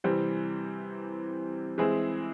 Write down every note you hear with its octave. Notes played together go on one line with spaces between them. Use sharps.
C3 E3 G3 C4
E3 G#3 C4 E4 G#4